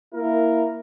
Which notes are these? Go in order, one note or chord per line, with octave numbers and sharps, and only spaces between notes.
A#3 E4 A#4